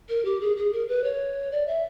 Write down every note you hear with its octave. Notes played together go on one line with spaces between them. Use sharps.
A#4
G4
G#4
G#4
A#4
B4
C#5
D5
E5